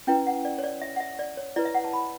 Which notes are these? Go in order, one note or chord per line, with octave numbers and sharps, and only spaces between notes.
C#4 E4 B4 G5
F#5
D5
C#5
D5
E5
F#5
E5
D5
C#5
E4 B4 D5
E5
F#5
A5
B5